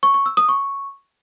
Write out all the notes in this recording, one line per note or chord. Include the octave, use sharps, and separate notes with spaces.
C#6
C#6
E6
D#6
C#6